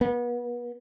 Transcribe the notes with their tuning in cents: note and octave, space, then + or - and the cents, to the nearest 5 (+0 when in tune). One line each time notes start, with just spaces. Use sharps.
B3 -35